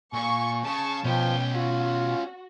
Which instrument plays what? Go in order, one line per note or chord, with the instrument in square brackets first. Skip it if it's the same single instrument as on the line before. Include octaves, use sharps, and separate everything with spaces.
[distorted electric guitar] A#2 [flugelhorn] G#5 [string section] C#6
[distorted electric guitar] C#3 [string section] A5 C#6
[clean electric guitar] B2 [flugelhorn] F3 [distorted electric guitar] C#4 B4 [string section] G5
[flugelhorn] F4 [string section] F#4